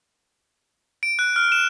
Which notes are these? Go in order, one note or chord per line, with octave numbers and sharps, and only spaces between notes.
D7
F#6
F6
E7